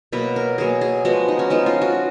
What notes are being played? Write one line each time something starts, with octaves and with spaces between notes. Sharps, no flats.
B2 F#3 A#3 B4
A#4
B2 F#3 A#3 G#4
G#4
F3 G#3 B3 F#4
D#4
C#4
F3 G#3 B3 D#4
F4
F#4